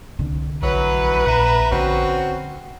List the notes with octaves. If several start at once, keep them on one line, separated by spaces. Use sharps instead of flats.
C2 D3
A#1 E3 F#3 B4
A#2 E5 F#5 A#5
D3 C4 C#4 F#4